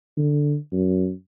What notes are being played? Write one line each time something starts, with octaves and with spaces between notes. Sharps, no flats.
D3
F#2